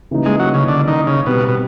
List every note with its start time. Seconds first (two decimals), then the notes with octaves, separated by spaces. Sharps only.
0.11 C#3 E3 G3 A#3 D#4
0.26 G#3
0.39 F#3
0.54 C#3
0.68 D3
0.88 D#3
1.07 C#3
1.26 B2 G3 C4 D#4
1.48 B2